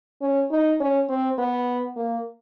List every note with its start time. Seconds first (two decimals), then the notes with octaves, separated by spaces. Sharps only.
0.21 C#4
0.51 D#4
0.80 C#4
1.09 C4
1.38 B3
1.96 A#3